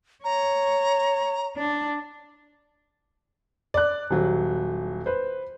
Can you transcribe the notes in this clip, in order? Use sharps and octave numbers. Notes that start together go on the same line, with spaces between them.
C#5 A#5
D4
D5 F#6
D#1 F#3
B4 C5